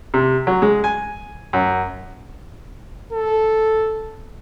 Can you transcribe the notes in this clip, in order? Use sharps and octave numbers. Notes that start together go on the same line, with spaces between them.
C3
F#3
G#3
G#5
F#2
A4